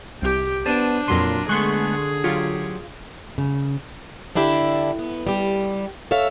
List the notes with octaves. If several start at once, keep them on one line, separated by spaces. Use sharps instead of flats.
C2 G4 G5
B3 D4 C5 D5 A5 D#7
F2 A#2 F#3 A#4 B4 C6
D3 G#3 A3 B3 G#4 C6 C#6 F#6
F#3 F4 G4 C#5
C#3
D3 D4 E4 G4
B3
G3 G4
A4 C#5 E5 F5